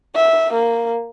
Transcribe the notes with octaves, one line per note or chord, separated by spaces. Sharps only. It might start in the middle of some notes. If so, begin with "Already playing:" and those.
E5
A#3